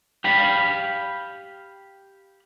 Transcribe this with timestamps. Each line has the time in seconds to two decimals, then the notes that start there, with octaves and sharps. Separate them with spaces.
0.24 G4 F5 B5